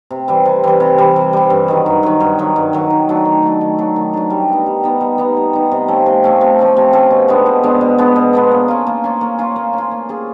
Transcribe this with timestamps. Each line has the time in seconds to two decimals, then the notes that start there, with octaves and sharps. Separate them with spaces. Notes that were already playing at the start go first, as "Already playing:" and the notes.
0.11 C3
0.28 E3 G3
0.45 C3
0.64 E3 G3
0.80 C3
0.98 E3 G3
1.16 C3
1.33 E3 G3
1.50 G2
1.68 D#3 F#3
1.86 G2
2.03 D#3 F#3
2.20 G2
2.39 D#3 F#3
2.56 G2
2.73 D#3 F#3
2.90 D#3
3.09 F#3 A3 D4
3.25 D#3
3.43 F#3 A3 D4
3.61 D#3
3.79 F#3 A3 D4
3.96 D#3
4.14 F#3 A3 D4
4.30 G3
4.48 B3 D#4
4.66 G3
4.83 B3 D#4
5.01 G3
5.18 B3 D#4
5.37 G3
5.53 B3 D#4
5.72 C3
5.88 F3 A3 C#4
6.06 C3
6.24 F3 A3 C#4
6.41 C3
6.59 F3 A3 C#4
6.77 C3
6.93 F3 A3 C#4
7.11 B2
7.28 G#3 B3 D4
7.46 B2
7.63 G#3 B3 D4
7.81 B2
7.98 G#3 B3 D4
8.16 B2
8.33 G#3 B3 D4
8.51 A#3
8.68 C#4 F4
8.87 A#3
9.04 C#4 F4
9.21 A#3
9.38 C#4 F4
9.56 A#3
9.73 C#4 F4
9.91 A#3
10.09 C#4 F4 G#4